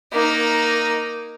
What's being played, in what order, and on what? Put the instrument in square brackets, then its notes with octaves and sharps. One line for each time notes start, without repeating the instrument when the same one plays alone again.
[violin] A#3 D#4